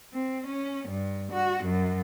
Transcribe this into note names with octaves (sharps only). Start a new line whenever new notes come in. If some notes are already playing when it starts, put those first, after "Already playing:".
C4
C#4
G2
F#4
F#2